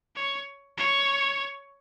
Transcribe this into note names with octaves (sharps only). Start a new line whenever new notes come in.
C#5
C#5